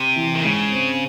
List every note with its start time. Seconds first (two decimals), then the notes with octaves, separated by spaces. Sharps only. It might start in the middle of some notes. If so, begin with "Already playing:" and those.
Already playing: C3
0.16 E3
0.35 D#3
0.44 G#2 C#3
0.72 C4